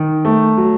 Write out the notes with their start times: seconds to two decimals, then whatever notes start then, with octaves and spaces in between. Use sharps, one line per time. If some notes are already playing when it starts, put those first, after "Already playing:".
Already playing: D#3
0.25 A3
0.57 F#3